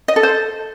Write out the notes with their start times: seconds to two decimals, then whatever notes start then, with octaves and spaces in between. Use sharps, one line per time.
0.08 D#5
0.16 A4
0.23 C5